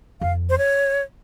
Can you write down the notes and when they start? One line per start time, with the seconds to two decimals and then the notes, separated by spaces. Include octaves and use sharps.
0.21 F2 F5
0.49 C5
0.58 C#5